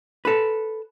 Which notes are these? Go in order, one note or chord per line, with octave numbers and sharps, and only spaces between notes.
A4 B4